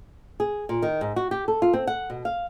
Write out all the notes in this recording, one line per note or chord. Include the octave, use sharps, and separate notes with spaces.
G#4
A#2
D#3
G#2
F#4
G4
A4
F4
C4
F#5
B2
F5